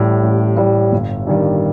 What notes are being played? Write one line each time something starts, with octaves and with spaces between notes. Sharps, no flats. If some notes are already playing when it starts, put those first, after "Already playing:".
Already playing: A1 A2 G3
A1
A2 G3
G1
G2 D#3 G3